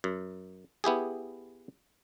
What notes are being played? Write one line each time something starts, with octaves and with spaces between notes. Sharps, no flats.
F#2
B3 E4 G4 G#4